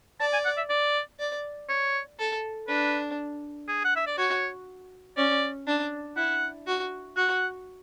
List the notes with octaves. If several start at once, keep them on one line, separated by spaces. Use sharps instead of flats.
D5 A5
G#5
F#5
E5
D5
D5
C#5
A4
D4 B4
G#4
F#5
E5
D5
F#4 C#5
C#4 D5
D4
E4 F#5
F#4
F#4 F#5